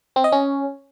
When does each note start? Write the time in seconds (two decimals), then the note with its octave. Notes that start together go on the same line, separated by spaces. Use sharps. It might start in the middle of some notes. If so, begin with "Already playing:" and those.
0.16 C4
0.24 D#5
0.32 C#4